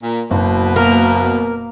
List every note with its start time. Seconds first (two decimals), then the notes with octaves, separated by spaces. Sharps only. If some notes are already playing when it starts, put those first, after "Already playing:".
0.03 A#2
0.31 F#1 B2
0.76 A#3 A#4